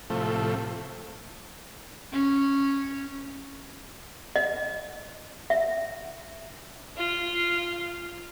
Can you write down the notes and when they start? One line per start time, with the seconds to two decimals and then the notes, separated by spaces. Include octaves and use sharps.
0.10 A2 C3 F3 A3
2.12 C#4
4.36 D#5
5.50 E5
6.96 F4